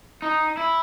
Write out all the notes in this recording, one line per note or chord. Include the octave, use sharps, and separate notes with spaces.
D#4
E4